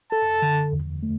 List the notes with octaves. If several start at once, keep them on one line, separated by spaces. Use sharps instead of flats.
A4 A5
D3
E2
A3